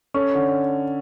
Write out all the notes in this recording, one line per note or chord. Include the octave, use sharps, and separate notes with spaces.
C#4 A4 C#5
D3